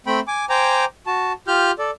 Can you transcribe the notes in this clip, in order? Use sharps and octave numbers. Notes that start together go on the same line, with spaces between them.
A3 C4 G5 B5
G#5 D6
C5 G5 G#5 A#5 D6
F#4 A5
F4 G4 F6 G6
A4 D5